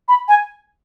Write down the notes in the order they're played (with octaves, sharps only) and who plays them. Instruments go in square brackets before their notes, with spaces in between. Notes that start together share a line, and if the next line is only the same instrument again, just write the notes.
[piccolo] B5
G#5